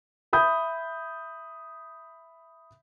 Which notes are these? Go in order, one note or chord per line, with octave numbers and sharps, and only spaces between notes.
E5 B5 D#6 G6